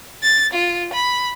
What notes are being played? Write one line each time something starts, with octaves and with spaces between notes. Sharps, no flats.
A6
F4
B5